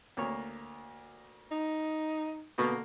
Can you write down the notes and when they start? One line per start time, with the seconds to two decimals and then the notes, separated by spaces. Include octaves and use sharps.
0.17 D2 A#3 C#5
1.51 D#4
2.58 B2 D3 A#3